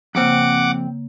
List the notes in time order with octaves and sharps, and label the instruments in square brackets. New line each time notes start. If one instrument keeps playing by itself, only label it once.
[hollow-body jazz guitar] F2 C4 [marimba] C#3 A#3 [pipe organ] F#5 D6